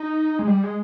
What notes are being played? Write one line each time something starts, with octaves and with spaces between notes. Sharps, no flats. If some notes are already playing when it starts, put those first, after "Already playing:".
Already playing: D#4
G#3
G3
G#3